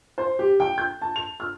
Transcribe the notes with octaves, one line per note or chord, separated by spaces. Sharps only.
C5
G4
G5
G6
A5
F7
F6